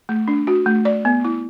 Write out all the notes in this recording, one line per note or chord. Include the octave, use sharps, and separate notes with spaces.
A3
D4
F#4
A3
D5
B3
E4